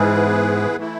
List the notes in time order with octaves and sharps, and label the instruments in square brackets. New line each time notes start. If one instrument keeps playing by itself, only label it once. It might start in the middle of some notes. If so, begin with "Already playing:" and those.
Already playing: [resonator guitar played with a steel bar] G#2 [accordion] E3 B3 E4 G#4 B4
[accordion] E3 A3 E4